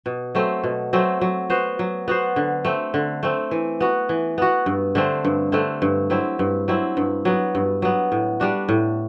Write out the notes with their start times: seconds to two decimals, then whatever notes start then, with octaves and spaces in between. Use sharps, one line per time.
0.06 B2
0.35 F#3 A3 C4
0.63 B2
0.93 F#3 A3 C4
1.21 F#3
1.50 B3 F#4 C5
1.79 F#3
2.08 B3 F#4 C5
2.36 D3
2.65 A3 C4
2.94 D3
3.23 A3 C4
3.51 E3
3.80 B3 F#4
4.09 E3
4.38 B3 F#4
4.66 G2
4.95 D3 A3 C4
5.25 G2
5.52 D3 A3 C4
5.82 G2
6.10 F#3 C4 E4
6.39 G2
6.68 F#3 C4 E4
6.97 G2
7.25 F#3 B3
7.55 G2
7.82 F#3 B3
8.12 A2
8.40 G3 D4 F#4
8.69 A2